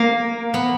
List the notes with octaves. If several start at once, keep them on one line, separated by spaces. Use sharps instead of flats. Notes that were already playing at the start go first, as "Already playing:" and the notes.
Already playing: A#3
B3